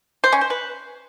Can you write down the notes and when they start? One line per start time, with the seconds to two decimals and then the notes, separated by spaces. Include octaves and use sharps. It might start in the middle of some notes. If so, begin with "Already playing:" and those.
0.24 C5
0.32 C#4
0.41 C5
0.50 B4